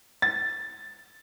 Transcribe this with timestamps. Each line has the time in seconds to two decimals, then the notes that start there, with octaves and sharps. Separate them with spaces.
0.22 A6